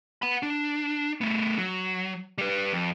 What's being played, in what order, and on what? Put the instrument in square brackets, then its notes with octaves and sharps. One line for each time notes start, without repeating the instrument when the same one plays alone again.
[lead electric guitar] F#5 B5
D4
A3 B3
F#3
G3 B4
F2